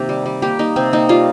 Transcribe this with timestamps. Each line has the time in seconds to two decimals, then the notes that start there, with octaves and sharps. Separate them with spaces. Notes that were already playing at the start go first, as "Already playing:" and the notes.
Already playing: C3 D#3 A#3 G4
0.09 G3
0.26 G3
0.42 A#3 G4
0.59 A#3 D#4
0.76 C3 C4
0.93 A#3 D#4
1.09 G3 F4